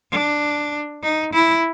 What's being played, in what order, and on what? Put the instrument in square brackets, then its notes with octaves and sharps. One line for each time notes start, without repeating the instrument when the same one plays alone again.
[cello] D4
D#4
E4